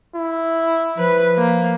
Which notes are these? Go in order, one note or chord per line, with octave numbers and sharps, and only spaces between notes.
E4
F3 B4
A#3